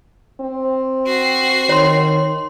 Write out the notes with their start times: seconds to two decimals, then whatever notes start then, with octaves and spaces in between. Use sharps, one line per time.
0.40 C4
1.07 F#4 C7
1.69 D#3 C#5 C6